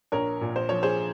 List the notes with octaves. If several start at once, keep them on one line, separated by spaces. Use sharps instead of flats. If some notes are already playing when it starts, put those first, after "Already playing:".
A#1 A#4 C#5
A#2
C5
F3 C#5
G#4 C5